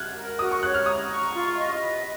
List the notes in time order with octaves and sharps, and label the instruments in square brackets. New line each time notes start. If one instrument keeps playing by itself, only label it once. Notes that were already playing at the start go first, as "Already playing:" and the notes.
Already playing: [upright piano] F6 F#6 G#6
[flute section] A#4
[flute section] F#4 [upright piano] D#6
[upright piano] C#6
[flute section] C#5 [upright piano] F#6
[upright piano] F6
[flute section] A#5 [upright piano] D#6
[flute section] C#6
F4
D#5
B4